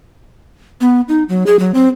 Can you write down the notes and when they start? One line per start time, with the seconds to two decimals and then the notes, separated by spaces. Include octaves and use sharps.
0.81 B3
1.09 D#4
1.29 F#3
1.46 G#4
1.59 F#3
1.74 C4